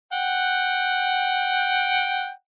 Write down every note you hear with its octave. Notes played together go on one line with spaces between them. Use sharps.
F#5 G5